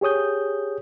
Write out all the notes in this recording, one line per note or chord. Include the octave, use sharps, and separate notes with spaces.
G4 G#4 C#5 D#6 G6